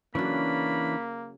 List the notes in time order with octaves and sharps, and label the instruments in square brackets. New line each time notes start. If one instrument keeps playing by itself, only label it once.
[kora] C#3 F#3 [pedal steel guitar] E3 C#4 D4 [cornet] A#3 [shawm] B5